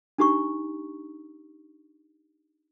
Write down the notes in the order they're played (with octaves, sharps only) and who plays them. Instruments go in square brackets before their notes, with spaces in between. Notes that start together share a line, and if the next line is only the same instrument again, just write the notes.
[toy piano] D4 D#4 G4 A#5 C#6